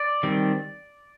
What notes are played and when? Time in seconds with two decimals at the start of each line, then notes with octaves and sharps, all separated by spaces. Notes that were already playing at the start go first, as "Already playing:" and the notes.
Already playing: D5
0.23 D#3 G3 C4